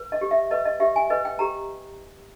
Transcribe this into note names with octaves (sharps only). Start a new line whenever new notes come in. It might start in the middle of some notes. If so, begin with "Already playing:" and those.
Already playing: B4
D#5
G4
E5
B4 D#5
D#5
G4 E5
G#5
B4 D#5
G5
G4 A#5